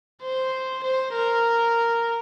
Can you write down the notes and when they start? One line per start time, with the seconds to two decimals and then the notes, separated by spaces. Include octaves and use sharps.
0.23 C5
0.84 C5
1.14 A#4